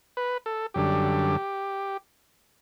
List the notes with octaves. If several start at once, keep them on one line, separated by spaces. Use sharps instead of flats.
B4
A4
F#2 D3 G3 G4